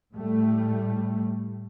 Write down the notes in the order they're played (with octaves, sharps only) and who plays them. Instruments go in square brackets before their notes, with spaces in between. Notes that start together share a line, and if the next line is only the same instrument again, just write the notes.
[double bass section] A2 G3 A3